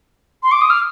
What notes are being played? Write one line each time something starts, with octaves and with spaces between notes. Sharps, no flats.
C6
D6
D#6
F6